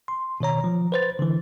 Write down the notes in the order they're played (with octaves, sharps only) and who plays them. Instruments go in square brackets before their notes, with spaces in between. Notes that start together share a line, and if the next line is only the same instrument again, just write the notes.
[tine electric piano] C6
B2 D#3 C#5 A#5
F3
B4 C5 A6
D3 E3